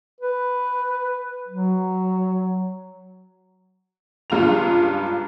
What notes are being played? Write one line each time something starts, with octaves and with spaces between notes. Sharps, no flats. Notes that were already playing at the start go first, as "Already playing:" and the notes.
B4
F#3
C#2 G2 F4 A#5 F7